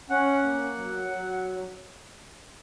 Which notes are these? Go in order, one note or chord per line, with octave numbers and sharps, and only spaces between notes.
C#4 F#5
A#3
F#3
F#3